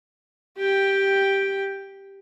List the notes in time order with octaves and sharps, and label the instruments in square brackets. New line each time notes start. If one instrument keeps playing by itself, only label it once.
[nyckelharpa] G4 G5